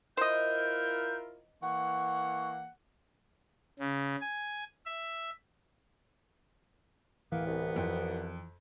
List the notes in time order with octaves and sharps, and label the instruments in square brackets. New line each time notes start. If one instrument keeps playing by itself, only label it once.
[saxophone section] E4 F4 A#4 [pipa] C5 D#5 [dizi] G6
[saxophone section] E3 A#3 F#5 [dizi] C#6
[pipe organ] C#3
G#5
E5
[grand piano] D1 [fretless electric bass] E3 [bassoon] A#3 [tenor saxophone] B3
[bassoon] C2
[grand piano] F2